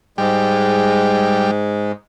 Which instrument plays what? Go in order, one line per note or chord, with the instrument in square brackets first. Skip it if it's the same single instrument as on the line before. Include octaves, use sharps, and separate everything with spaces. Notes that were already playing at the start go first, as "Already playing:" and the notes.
[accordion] G#2 G#3 [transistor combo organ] G3